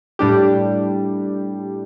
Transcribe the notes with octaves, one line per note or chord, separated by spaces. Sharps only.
A2 G3 D4 G4